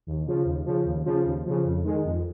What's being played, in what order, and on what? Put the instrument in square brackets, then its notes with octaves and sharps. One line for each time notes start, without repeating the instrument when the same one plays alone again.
[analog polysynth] D#2
C#3 F3
D#2
C#3 F3
D#2
C#3 F3
D#2
C#3 F3
F2
D#3 G#3
F2